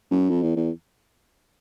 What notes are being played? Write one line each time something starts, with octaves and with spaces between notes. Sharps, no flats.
F#2
F2
E2
E2